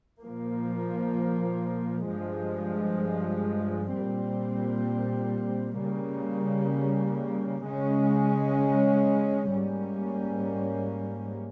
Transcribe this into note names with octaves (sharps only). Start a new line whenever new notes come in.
A#2 F3 A#3
G2 F3 G#3
A#2 G3 C4
C#3 G3 A#3
C#3 G#3 C#4
G#2 G3 A#3 C#4